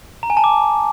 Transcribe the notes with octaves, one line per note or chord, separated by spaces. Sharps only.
A#5
G#5
A5
D6